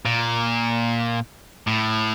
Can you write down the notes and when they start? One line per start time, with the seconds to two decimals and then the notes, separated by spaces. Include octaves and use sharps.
0.06 A#2
1.67 A2